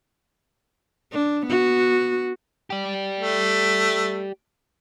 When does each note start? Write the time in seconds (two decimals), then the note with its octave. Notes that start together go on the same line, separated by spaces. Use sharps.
1.12 D4
1.47 B3 F#4
2.70 G4 D5
3.19 A3